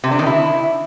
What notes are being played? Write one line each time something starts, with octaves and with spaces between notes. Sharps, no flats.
C3
D4
D#3
E4